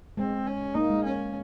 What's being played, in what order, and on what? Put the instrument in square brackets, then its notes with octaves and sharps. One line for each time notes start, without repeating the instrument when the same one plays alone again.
[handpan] G#3 [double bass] C4
[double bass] C#4
[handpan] A#3 [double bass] D#4
[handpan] G#3
[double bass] C#4